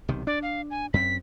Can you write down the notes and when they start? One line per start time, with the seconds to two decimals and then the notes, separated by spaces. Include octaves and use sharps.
0.08 B1 C3 D#3
0.27 D4 D5
0.43 F5
0.71 G#5
0.94 F#2 C4 B6